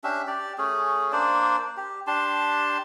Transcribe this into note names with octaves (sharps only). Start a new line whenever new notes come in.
C#4 D4 G4 E5
G4 D5
A3 C#4 G#4
A#3 D4 C5 D5
G4
D4 G4 A5 C6